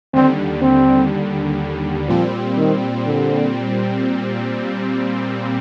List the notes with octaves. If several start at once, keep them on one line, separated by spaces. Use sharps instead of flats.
D#2 D3 G3 C4
C4
A#2 F3 G3 C4
D#3
D3